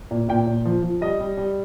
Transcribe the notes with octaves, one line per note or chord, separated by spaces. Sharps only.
A#2
A#2 G5
A#2
F3
F3
G3 D#5
G3
G3